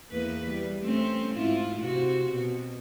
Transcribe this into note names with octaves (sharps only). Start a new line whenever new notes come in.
E2 A#3 B4
G3
A3 C4 C#4
G#2 E4 F4
C3 C4 F#4
B2